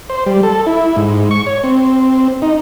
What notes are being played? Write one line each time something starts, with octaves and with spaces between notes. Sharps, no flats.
C5
G3
A4
E4
G#2
C#6
C#5
C4
D#4